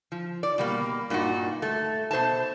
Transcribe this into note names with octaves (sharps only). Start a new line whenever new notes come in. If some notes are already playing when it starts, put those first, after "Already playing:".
F3
D5
B2 G3 A#3
G2 A#2 A#3 D#4 F#4
A3
B2 C5 E5 A5